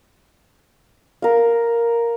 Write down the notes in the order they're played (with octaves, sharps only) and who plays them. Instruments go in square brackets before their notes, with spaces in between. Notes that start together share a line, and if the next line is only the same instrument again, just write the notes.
[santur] A#4 F5